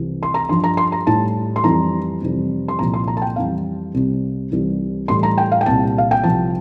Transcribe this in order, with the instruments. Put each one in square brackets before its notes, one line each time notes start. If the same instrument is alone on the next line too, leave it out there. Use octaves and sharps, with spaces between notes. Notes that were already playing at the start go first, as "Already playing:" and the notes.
Already playing: [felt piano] C2 C3 E3
C6
A#5
G2 F3 C6
A#5
C6
A#5
A2 G3 A5
C6
F2 E3 G3 A#5
F2 C3 E3 G3
C6
C2 A#2 F3 A#5
C6
A#5
A5
G5
F2 E3 G3 F5
C2 C3 G3
C2 C3 E3 G3
A2 E3 G3 C6
A#5
G5
F5
G5
C2 A#2 G3 A5
F5
G5
C2 C3 F3 A5